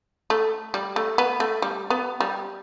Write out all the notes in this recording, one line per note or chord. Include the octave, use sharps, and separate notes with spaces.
A3
G3
A3
B3
A3
G3
B3
G3